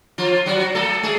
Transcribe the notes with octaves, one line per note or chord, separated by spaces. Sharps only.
F3 F4
F#3 F#4
A3 A4
G#3 G#4